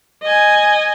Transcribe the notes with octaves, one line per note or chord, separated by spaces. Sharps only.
D#5 G#5